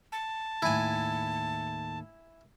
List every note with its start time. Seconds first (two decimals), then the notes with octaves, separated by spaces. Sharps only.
0.12 A5
0.62 D#2 A2 E4 G#5